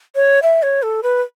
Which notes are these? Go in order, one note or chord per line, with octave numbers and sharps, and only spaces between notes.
C#5
E5
C#5
A4
B4